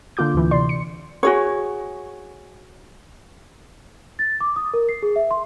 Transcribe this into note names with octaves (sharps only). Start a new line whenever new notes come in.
D3 A#3 F4 D6 G6
D2 A2 E3
C3 D5 C6
C#7
F#4 G#4 C#5
A6
D6
D#6
A#4
C7
G#4
E5
C6